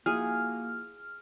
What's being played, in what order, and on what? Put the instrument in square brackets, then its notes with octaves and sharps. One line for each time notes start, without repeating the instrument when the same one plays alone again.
[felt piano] F3 E4 F#4 [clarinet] A#3 [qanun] G#4 [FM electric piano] F6